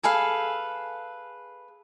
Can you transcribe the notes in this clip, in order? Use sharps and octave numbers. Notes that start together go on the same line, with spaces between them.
G#4 A4 B4 F5